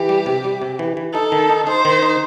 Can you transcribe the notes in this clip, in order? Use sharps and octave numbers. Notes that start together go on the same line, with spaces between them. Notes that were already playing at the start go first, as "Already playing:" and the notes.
Already playing: E3 G4
G3
C3
G3
C3
E3
E3
D#4 A4
D#3
D#4
D#4 C5
D#3
D#4